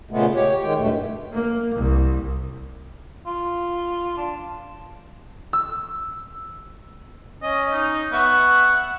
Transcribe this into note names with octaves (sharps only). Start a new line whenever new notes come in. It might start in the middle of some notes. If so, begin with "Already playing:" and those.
A#2 C#3 G#3 A3 B3
G4 C#5
D#3 G#3 G5
E2 G2 B2 A3
A#3
C2
F4
D4
E6
C#4 D#5
D#4
B3 E5 F#5 C#6